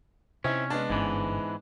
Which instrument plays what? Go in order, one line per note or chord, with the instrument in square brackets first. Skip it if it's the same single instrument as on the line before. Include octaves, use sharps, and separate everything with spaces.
[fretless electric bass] C3 [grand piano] C4 D#4 E4 [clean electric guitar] C#4
[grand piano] G#3 B3 D4
[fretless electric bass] G1 C#4 [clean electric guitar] G#2 E3